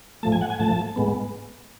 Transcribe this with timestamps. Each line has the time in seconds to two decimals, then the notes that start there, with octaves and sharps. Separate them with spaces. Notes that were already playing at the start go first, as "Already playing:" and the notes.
0.23 A2 F3 A3 A5
0.32 G#5
0.41 F#5
0.50 G#5
0.59 A2 F3 A3 A5
0.96 A2 G#3 B3